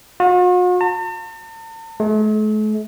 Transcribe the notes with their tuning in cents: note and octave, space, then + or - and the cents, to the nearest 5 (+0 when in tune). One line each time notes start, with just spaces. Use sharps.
F#4 -45
A5 +45
A3 -45